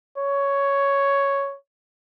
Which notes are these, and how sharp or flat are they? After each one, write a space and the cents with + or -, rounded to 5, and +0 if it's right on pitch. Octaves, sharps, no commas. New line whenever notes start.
C#5 +5